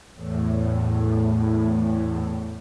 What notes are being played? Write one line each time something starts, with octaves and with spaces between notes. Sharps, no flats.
E2 A2